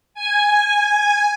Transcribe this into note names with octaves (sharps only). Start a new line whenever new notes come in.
G#5